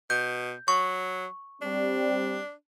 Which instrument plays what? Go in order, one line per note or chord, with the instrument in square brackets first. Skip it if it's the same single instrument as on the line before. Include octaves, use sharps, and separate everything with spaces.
[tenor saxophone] B2 [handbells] G6
[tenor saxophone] F#3 [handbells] C#6
[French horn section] G3 C4 [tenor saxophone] D4